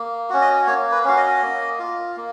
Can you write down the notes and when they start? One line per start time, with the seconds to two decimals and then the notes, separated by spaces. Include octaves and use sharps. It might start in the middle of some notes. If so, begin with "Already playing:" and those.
Already playing: A#3
0.30 C#4 F#4
0.42 D#5
0.67 A#3 C#5
0.92 B4
1.05 C#4 F#4 F5
1.17 D#5
1.42 A#3
1.79 F4
2.17 A#3